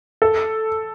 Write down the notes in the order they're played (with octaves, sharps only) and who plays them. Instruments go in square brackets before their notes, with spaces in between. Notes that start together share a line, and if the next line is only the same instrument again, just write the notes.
[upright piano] A4